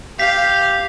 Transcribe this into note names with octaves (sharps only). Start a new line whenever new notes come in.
G4 F5 B6